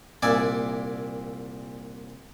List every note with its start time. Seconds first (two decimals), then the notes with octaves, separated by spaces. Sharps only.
0.22 C2 A#2 D5 E5 G#5